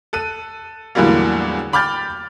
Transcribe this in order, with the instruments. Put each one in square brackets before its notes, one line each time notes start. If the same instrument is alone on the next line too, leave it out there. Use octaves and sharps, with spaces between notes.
[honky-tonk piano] A4 F#6 D#7
E2 A2 D3 F#3 G3 A#3
G5 B5 D6 F6 G6 A6